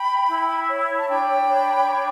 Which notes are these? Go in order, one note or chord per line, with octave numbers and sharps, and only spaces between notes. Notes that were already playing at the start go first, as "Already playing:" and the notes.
Already playing: G5 B5
E4
C#5
A5
D4 G5 B5
C#5
D4